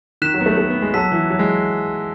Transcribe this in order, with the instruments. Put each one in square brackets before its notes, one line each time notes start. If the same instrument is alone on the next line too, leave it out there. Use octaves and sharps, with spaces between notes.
[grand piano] D#3 [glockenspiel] F#6 B6 E7
[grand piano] F#3
B3
A3
A3
B3
G#3
[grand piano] F#3 [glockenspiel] A5 E6 B6
[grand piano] E3
F#3
G#3